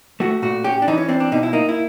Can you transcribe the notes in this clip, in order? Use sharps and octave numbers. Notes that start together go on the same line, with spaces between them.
A3 F#4
A#2 F#4
C#4 G4
D4
E3 D#4
C#4
C4 D4
D4
B2 D#4
E4
A#3 D#4
E4